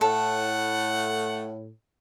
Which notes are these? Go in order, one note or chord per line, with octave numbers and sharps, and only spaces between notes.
A2 A3 A4 F#5